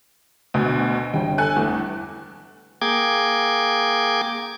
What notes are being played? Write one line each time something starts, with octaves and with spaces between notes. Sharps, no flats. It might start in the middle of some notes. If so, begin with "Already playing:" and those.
D2 B2 D3 B3
G1 G5
A4 G#5 F#6
E2 A3
A#3 G#4 G5 D6 G#6